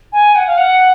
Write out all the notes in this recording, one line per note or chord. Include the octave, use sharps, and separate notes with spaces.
G#5
F#5
F5
F#5